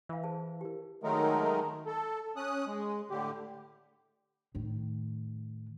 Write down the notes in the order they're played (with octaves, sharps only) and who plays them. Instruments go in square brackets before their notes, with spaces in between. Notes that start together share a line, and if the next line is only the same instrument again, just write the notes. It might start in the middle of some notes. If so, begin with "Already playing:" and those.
[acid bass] E3 [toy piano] E5 F5
[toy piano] G#4 C5 A5
G4 A#4
[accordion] D#3 F#3 G#3 A3 D#4 A#4
A4
C#4 D#6 F#6
G#3
A2 D3 G4
[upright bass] A2 D#3